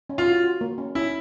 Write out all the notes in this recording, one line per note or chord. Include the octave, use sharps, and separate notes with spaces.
C#4
F4
F#4
F#4
A#3
C#4
C#4 E4